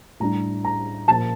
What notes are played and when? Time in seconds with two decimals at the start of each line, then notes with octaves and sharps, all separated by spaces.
0.20 A2 G3 D4 A#5
0.65 A#5
1.08 A#2 F3 A#3 A5